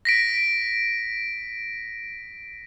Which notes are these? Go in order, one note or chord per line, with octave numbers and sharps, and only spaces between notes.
A#6 B6 D7